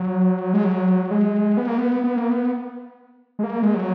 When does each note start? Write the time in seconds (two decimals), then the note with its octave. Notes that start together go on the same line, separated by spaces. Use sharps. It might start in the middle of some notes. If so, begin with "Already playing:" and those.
Already playing: F#3
0.54 G#3
0.64 F#3
1.11 G#3
1.57 B3
1.68 A#3
1.78 B3
2.04 B3
2.17 A#3
2.30 B3
3.39 G#3
3.43 A#3
3.63 G#3
3.74 F#3